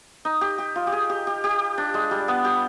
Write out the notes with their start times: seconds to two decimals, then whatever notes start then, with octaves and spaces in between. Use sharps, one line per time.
0.25 D#4
0.41 G4
0.58 G4
0.76 F4
0.87 G4
0.92 G#4
1.10 G4
1.27 G4
1.44 G4
1.78 D4
1.94 G#3
2.11 G3
2.28 B3
2.45 G4